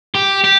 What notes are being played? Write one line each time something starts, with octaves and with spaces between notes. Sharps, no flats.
G4
G4